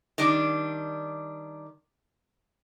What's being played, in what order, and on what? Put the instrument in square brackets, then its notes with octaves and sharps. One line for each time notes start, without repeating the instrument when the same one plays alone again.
[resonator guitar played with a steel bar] D#3 G3 D4